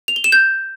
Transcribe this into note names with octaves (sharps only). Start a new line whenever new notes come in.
F7
G7
E7
G6